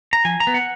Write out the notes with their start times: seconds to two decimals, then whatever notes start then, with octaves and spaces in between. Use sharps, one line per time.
0.13 A#5
0.25 F3 G#5
0.40 A#5
0.47 B3
0.54 F#5